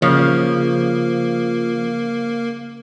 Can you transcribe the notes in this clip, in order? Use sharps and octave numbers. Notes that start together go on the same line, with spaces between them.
C#3 F3 A#3